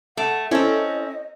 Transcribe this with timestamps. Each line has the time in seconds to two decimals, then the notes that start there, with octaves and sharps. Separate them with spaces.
0.17 A3 F#5
0.51 C4 C#4 E4 A4 C5 D#5